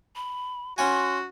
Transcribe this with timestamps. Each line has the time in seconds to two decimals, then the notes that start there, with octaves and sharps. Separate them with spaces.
0.16 B5
0.78 C#4 F#4 F#5 G#5 C6